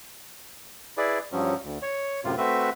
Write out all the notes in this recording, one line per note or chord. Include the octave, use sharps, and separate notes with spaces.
E4 G#4 B4 D5
G2 F3 F#3 C#4
D2
C#5
F#2 A2 C3 F4
A3 C4 F#4 B4 E5